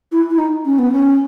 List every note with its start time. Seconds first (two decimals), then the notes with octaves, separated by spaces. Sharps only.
0.12 E4
0.30 E4
0.38 D#4
0.65 C#4
0.79 B3
0.92 C#4